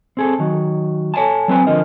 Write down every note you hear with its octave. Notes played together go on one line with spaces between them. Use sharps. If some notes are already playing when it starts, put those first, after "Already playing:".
C4 G#4 A4
D#3 F#3
A4 C#5 F5 G#5 A5
F#3 C4 B4 G#5
D3 F3 F4 A#4 D#5